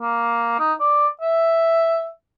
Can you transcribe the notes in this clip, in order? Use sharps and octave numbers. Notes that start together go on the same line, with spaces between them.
A#3
D#4
D5
E5